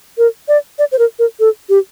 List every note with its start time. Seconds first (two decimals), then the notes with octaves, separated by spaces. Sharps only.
0.18 A#4
0.48 D5
0.79 D5
0.92 C5
0.99 A#4
1.19 A#4
1.40 A4
1.69 G4